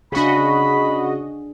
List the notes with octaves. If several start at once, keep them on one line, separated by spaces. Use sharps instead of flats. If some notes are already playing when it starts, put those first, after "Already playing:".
C#3 D4 F#4 G#4 D#5 B5